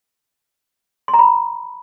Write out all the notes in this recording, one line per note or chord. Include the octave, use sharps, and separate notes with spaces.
C6
A#5
B5